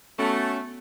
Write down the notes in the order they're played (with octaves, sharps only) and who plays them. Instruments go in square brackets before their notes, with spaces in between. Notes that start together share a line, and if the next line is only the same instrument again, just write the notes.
[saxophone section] A3 [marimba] B3 A5 [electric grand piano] C#4 [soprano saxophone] F#4